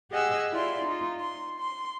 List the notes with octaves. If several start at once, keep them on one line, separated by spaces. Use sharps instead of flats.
G4 G#4 D#5 F#5 G#5 E6
E4 F4 D5 C6
D#4 F4
C6
C6